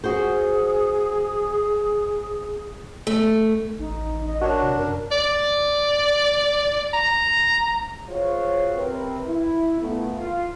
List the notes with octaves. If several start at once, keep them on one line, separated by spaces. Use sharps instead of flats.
F#4 G#4 C5
A3
A1 D#4
D#5
D4 F#4 A#4 C#5
C3
F#2 A#4
D5
A#5
F4 F#4 G#4 C5 C#5
C3 C4 A#4 B4
E4
A#2 A3 B3
F4